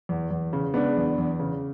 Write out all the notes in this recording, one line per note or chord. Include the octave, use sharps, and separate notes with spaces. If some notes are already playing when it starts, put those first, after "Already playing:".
E2
E2
C#3
G#3 B3 D4
E2
E2
C#3